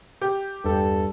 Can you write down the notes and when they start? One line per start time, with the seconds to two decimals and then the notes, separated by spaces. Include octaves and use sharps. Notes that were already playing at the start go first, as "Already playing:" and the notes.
0.21 G4
0.64 E2 G2 A4